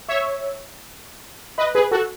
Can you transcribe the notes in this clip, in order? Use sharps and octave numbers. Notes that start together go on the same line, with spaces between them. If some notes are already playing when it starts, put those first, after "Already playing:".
C#5 E5
B4 D#5
G#4 B4
F#4 A4